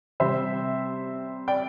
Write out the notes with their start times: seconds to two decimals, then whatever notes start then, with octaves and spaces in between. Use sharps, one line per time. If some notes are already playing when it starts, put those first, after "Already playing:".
0.20 C3 G3 C4 C5 E5
1.48 D5 G5